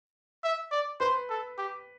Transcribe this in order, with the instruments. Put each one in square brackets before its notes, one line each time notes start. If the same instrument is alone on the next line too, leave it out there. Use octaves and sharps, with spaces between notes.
[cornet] E5
D5
[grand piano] B4 [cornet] C5
[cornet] A4
G4